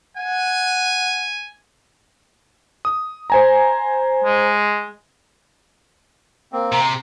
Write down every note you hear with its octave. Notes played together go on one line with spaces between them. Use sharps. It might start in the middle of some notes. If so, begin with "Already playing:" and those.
F#5 G#5
D#6
C5 G#5 A#5
G#3
A#3 C4
C3 A#5
C6